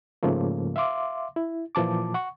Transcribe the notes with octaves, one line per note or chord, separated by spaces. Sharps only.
G#2 C#3 F3 A3 A#3
E5 F5 C6 D6
E4
A#2 E3 F3 A5 D6
F#5 C#6